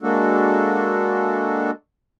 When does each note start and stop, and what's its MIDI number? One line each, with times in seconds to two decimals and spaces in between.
0.02 1.71 56
0.02 1.71 58
0.02 1.71 62
0.02 1.71 66
0.02 1.71 69